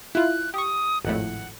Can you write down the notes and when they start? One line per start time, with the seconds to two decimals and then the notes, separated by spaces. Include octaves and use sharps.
0.15 E4 F4 F#6
0.54 G4 C#6 D#6
1.05 G#1 F2 A2 F#5